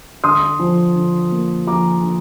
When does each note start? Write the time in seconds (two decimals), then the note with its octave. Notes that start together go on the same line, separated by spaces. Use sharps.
0.24 D3 C6 D#6
0.60 F3
0.95 D3
1.32 A#3
1.67 F3 A#5 D6
2.03 D3